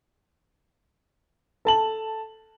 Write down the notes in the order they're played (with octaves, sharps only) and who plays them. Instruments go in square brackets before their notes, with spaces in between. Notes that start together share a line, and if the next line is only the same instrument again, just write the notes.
[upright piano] A4 A5 F#7